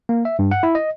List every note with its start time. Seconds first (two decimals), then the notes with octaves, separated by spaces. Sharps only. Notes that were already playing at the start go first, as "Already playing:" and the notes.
0.09 A#3
0.25 E5
0.39 G2
0.51 F#5
0.63 E4
0.75 D#5